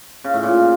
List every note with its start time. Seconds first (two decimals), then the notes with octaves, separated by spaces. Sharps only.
0.24 C#3
0.34 A2
0.43 A#2